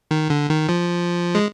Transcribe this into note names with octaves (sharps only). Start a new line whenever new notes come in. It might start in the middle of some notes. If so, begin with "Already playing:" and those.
D#3
D3
D#3
F3
G#3